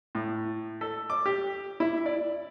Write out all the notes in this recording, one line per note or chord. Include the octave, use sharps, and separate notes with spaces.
A2
A4
D6
G4
E4
D5